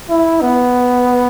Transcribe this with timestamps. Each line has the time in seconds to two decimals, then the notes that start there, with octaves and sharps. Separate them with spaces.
0.10 E4
0.41 B3